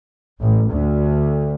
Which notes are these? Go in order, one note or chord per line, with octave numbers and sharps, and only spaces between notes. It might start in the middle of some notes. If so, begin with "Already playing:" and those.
A1
D2